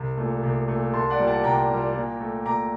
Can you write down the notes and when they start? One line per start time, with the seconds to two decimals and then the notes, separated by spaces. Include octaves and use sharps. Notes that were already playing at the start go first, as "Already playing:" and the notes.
Already playing: C2
0.17 A#2 A3
0.43 C2
0.68 A#2 A3
0.93 C2 A5 C6
1.10 D5 F#5
1.19 A#2 G3
1.27 F#5 A5
1.43 C2 G5 A#5
1.69 A#2 G3
1.94 A#2
2.21 A3
2.45 A#2 A#5 D6